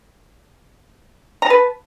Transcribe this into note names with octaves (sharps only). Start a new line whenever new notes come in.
B4 A5 A#5